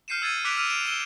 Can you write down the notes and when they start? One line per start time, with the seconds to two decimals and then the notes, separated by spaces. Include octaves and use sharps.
0.08 F6 G6 C7 C#7 D#7 E7
0.22 E6 G#6 A6 D#7
0.45 D6 E6 F#6 B6 D7 F7
0.56 E6 F6 D#7 F7
0.69 D7 E7 F7
0.86 E6 D#7 E7 G7